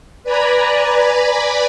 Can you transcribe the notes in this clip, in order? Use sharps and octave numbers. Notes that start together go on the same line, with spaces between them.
B4 D5 G#5 A#5 B5